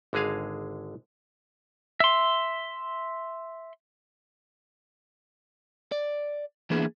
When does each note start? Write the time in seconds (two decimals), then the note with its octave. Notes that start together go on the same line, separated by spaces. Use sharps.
0.13 G#1 D3 G#3 G#4 F5
2.00 E5 C6
5.92 D5
6.70 E3 A#3 B3 D4 E4 G#4